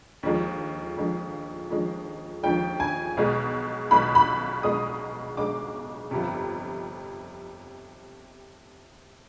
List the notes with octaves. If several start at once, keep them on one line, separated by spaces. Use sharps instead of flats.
D#2 D3 F3 G#3
D#2 D3 F3 G#3
D#2 D3 F3 G#3
D#2 D3 F3 G#3 G5
G#5
B1 B2 G#3
B1 B2 G#3 B5
B5
B1 B2 G#3 D#6
B1 B2 G#3 D6
G1 F2 C3